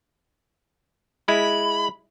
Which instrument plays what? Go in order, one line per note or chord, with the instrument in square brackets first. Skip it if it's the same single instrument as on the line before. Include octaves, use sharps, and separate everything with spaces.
[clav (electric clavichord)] G#3 E4 [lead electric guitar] B5